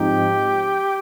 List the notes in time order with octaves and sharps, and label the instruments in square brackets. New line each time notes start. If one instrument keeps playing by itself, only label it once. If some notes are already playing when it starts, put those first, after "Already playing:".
Already playing: [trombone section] G#2 F3 C4 D#4 [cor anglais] G4